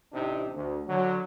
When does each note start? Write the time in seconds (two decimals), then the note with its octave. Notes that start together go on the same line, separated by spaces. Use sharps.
0.13 A1 C3 D4 D#4
0.54 D2
0.88 D3 F#3